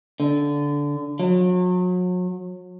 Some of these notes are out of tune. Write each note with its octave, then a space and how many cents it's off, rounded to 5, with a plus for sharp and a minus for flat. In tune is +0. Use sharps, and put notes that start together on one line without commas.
D3 -15
F#3 -35